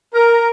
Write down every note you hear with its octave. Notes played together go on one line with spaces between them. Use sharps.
A#4